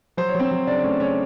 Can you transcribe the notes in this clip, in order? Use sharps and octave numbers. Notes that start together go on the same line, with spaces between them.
F#3 C5
C#5
F#3
C4 C5
F#3
C#3 D4 D5
A3 C#4 C#5
C#3 C#4 C#5